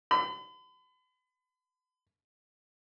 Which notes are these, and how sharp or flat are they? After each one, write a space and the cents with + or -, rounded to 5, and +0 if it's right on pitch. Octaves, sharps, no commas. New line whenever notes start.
B5 +40